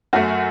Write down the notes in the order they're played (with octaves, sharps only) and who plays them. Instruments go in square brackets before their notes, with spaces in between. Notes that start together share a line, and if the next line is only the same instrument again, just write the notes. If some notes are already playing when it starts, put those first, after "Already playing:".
[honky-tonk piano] F#2 F#3 A3 F#4